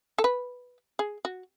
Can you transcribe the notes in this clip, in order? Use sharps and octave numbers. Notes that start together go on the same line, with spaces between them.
A4
B4
G#4
F#4